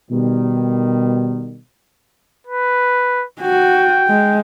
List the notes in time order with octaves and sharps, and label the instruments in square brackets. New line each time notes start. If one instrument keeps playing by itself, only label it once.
[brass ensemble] B2 D#3 G3
[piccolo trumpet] B4
[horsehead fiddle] F#4 [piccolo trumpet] G5
[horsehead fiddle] G#3